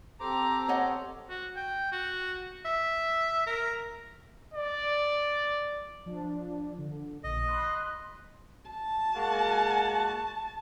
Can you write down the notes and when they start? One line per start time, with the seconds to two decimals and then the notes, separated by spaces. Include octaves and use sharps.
0.20 C4 G4 A4 C5 A#5 D6
0.68 C#5 D#5 F#5
1.29 F#4
1.56 G5
1.92 F#4
2.65 E5
3.47 A#4
4.54 D5
6.06 F3 D4
6.78 D3
7.24 A#1 D#5
7.47 B5 C6 F#6
8.70 A5
9.16 G#3 A#3 F#4